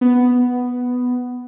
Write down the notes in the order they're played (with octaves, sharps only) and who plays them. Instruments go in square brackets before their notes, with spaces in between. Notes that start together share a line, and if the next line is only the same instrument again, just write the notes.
[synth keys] B3